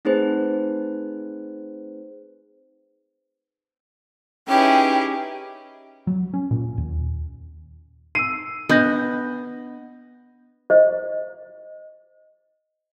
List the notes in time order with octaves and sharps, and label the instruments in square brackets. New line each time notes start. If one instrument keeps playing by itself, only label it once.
[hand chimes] A3 C4 D#4 G#4 B4 C5
[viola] C#4 [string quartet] D#4 E4 B4 [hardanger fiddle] G4 G#4 [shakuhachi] G5
[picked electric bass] F#3
C#4
A#2
D#2
[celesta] E6 C7 [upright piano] D#7
[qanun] B3 [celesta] D4 A#6 [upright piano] D#5 G6
[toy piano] C5 D#5